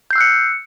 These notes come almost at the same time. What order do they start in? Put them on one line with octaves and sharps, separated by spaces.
G6 C7 E6 F#6 C#7